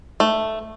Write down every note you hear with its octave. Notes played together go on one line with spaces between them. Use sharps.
A3